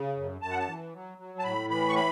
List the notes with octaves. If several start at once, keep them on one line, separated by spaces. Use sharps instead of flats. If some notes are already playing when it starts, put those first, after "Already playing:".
Already playing: C#3
F#2
F#2 A5
F#5
A5
E3
F#3
F#3
A5
A2 B5
E3 B5
C#6
B5